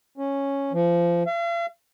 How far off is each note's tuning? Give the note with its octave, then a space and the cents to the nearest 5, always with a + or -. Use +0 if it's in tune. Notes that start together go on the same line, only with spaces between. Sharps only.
C#4 -5
F3 -25
F5 -45